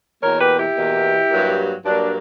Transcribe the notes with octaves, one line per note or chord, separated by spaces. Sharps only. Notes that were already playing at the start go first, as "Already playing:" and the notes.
E2 B2 A#3 A#4 C#5
G4 B4
E4 G4
E2 B2 A#3
G2 F#3 A#3
G2 F#3 A#3 D4